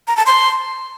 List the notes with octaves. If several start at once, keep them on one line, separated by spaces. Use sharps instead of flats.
A#5
A5
C6